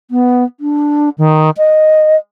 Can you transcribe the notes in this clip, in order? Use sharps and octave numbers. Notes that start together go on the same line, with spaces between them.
B3
D4
D#3
D#5